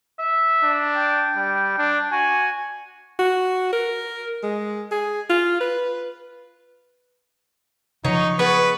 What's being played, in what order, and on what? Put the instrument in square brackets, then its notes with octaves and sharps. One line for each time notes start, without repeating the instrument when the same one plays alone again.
[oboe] E5
[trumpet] D4
[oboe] G5
[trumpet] G3
D4
[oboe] F#4 [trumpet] G#5
[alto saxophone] F#4
A#4
G#3
G#4
F4
B4
[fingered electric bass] C#3 F3 [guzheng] F#3 [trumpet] D#4 [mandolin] C#5
[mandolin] B3 [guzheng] G#4 C#5 [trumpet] B4